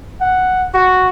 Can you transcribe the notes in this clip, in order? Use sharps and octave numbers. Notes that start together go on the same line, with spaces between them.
F#5
F#4